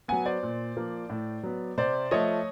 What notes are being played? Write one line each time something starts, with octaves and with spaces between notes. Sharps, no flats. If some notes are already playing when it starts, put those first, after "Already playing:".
F#3 B3 F#5 G#5
C5 D5
A#2
F3 A#3
A2
F#3 B3
C3 C5 D5
F3 A3 C#5 D#5